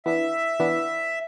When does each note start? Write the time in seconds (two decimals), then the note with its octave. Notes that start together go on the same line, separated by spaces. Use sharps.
0.06 E3 B3 D4 E5
0.60 E3 B3 D4